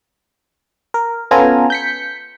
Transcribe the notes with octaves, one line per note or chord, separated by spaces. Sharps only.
A#4
B3 C#4 F4 A4 G#5 A#5
G6 B6 C#7